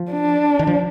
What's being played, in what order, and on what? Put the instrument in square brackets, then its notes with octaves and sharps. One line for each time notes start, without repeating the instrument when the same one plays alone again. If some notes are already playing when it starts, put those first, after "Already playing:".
Already playing: [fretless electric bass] F3
[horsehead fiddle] D4
[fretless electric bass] D#3
F3